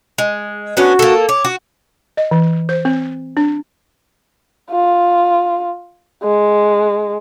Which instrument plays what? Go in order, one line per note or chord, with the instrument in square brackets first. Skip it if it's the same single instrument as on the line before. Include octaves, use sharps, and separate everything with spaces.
[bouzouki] G#3
[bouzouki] B3 C#4 D4 [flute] F#4
[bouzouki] A#3 A4
[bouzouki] C#5 [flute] D6
[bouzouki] F#4
[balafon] D#5
E3
C5
C4
D4
[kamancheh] F4
G#3